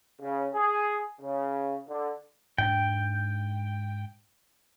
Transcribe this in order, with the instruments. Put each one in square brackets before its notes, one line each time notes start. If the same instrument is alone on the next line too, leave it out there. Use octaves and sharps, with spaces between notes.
[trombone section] C#3
G#4
C#3
D3
[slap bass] G#2 C#4 D4 [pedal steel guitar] G5